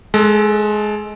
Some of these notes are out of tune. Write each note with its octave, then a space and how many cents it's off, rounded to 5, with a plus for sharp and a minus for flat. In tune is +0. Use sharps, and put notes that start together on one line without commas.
G#3 +20 A4 +0